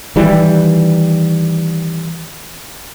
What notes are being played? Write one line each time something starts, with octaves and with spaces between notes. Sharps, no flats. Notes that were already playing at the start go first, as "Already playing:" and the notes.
D#3 E3 G3